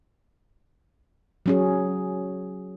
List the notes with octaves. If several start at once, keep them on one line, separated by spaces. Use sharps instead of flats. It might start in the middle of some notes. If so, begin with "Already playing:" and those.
F#3 C#4 G#4